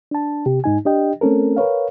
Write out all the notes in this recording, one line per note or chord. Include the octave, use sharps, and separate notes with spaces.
D4 A5
C3 G4
G#2 D#4 G#5
D4 G4 D#5 G5
A3 C4 C#4 A4 A#4
A#4 B4 C#5 F5